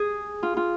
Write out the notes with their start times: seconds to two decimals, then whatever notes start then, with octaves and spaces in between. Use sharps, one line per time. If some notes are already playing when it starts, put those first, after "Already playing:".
Already playing: G#4
0.43 F4
0.57 F4